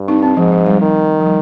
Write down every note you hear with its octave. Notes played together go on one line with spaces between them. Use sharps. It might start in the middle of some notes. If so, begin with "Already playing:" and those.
Already playing: G2
C4 D#4
C4
G#2 F3
F3
G3
D#3
F3
G3